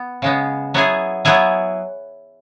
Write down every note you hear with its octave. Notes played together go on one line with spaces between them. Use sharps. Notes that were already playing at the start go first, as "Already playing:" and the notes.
Already playing: B3
C#3 G#3 B3
F#3 B3 E4 G#4
F#3 B3 E4 G#4